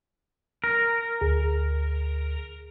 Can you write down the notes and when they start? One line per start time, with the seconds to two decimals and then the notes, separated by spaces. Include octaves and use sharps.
0.64 A#4
1.21 D2 G#4